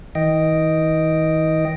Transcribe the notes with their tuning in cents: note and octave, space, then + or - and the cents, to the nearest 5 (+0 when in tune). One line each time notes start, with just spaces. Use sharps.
E3 -45 D#5 +0 G5 +0